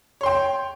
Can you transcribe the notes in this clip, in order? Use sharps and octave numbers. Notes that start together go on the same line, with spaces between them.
C#5 G5 C6